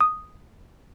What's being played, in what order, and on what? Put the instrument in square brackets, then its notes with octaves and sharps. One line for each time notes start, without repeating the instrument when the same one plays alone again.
[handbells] D#6